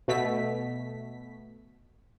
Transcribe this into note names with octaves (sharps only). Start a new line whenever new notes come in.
B2 A3 B6